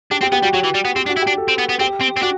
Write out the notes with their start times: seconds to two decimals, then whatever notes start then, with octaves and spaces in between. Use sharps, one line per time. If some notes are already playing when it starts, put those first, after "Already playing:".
0.11 D4 G4
0.21 C4 G4
0.32 B3 G4
0.43 G3 F#4
0.53 F#3 F#4
0.64 E3
0.74 G3
0.85 B3
0.96 C4 G4
1.06 D4 F#4
1.17 E4
1.22 G4
1.27 D4
1.37 A4
1.48 C4
1.59 B3
1.69 B3
1.80 C4 G4
2.01 C4
2.17 C4
2.22 D4 F#4